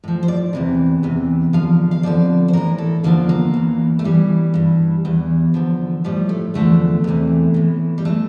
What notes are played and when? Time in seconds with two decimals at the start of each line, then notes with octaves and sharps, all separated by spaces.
0.04 A2 F3
0.23 C5
0.28 D5
0.53 E2 C3 E3
1.03 E2 C3 E3
1.53 E2 D3 F3 F5
1.91 F5
2.03 F2 D3 F3 D5
2.48 C5
2.53 A2 E3 A#4
2.78 A4
3.03 E2 D3 F3 A#3
3.29 A#3
3.54 E2 E3
3.99 A3
4.04 A2 E3 G3
4.54 G2 E3
5.05 E2 E3
5.54 E2 D3 F3
6.04 A2 F3 G3
6.29 A3
6.54 E2 D3 F3 A3
7.04 E2 C3 E3
7.54 A2 E3
7.98 G3
8.05 E3 A3